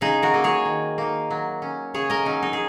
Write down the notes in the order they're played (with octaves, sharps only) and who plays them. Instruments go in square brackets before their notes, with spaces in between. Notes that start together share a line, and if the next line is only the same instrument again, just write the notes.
[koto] C#3 D#4 G#4
F#4 A#4
F#3 A#3 D#4
G#4 C#5
D#3
A#3 D#4
F#3
C#4
C#3 G#4 C#5
A#4 D#5
F#3 C#4 D#4
D#4
G#4